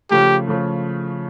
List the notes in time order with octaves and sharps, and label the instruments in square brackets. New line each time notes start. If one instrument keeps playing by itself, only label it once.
[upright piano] C#3 F3 A3 [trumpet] G4
[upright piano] C#3 F3 A3